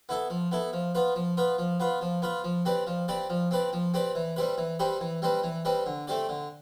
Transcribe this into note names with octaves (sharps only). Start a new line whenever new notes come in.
B3 E4 A4
F3
B3 E4 A4
F3
B3 F4 B4
F3
B3 F4 B4
F3
B3 F4 B4
F3
B3 F4 B4
F3
C4 G4 B4 D5
F3
C4 G4 B4 D5
F3
C4 G4 B4 D5
F3
C4 G4 B4 D5
E3
G3 C4 G4 B4
E3
G3 C4 G4 B4
E3
G3 C4 G4 B4
E3
G3 C4 G4 B4
D3
A3 C4 G4 D5
D3